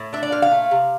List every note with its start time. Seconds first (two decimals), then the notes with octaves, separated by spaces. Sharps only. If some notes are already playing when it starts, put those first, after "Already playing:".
Already playing: A2
0.13 D4 E5
0.23 D5
0.32 A#2 F5
0.42 F5
0.51 A3
0.71 C3